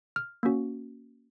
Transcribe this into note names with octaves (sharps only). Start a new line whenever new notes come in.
F6
A#3 C#4 F#4